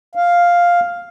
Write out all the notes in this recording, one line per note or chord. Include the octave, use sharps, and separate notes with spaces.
F5